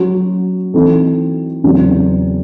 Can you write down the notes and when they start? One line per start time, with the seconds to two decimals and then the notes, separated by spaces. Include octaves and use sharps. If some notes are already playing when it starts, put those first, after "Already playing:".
Already playing: F#3 C#4 F#4
0.74 E3 C4 D#4 F#4 A4
1.64 E2 C#3 F#3 C4